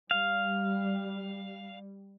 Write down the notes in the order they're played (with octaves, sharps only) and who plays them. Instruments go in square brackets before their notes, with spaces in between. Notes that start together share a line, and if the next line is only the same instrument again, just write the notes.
[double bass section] G3 [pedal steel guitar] F5